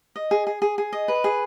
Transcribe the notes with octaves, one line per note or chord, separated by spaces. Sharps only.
D#5
G#4
G#4
G#4
G#4
D#5
B4
G#4